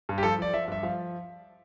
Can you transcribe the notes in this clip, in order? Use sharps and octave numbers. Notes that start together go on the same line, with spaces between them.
G2
G4
F3 A4
F3 D5
F3 E5
G2 E5
F3 F5